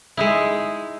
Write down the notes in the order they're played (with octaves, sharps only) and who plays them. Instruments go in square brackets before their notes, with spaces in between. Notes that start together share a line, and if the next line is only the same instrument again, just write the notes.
[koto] G#3 D#4 E4